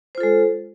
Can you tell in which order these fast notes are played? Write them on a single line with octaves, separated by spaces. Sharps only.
C5 F4 A4 G#3